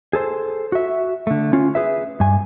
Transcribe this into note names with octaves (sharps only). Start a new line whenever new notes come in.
G#4 A4 C5
F#4 E5
D3 A3
C#4 F4
G#4 B4 E5
G2 G#5